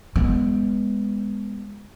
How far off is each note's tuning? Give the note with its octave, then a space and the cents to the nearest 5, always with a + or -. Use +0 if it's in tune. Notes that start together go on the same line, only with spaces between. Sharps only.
G#3 -20 B3 +0